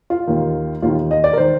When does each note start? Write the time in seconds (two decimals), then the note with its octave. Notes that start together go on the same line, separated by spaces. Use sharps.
0.10 F4
0.27 D#2 D#3
0.82 D#2 D#3 F4
1.11 D#5
1.24 D5
1.33 A#4
1.37 D#3 C5